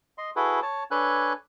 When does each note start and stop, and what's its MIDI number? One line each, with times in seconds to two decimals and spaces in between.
0.18 0.30 75
0.18 0.30 84
0.36 0.60 64
0.36 0.60 66
0.36 0.60 68
0.36 0.60 69
0.36 0.60 71
0.62 0.84 73
0.62 0.84 81
0.91 1.33 62
0.91 1.33 69
0.91 1.33 71
0.91 1.33 73
0.91 1.33 80
0.91 1.33 90